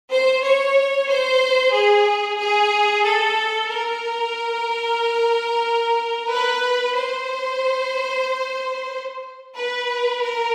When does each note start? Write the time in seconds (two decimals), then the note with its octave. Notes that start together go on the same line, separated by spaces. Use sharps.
0.10 C5
0.43 C#5
1.07 C5
1.73 G#4
2.38 G#4
3.04 A4
3.69 A#4
6.30 B4
6.95 C5
9.56 B4
10.22 A#4